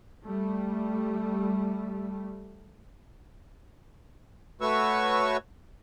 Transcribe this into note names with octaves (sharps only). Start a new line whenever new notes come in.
G3 A3
A3 F#4 B4 C#5 C#6 E6